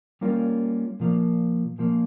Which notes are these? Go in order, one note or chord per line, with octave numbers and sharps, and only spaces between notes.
G3 A#3 C#4 F4 A#4
A#2 F3 A#3
A#2 F3 A#3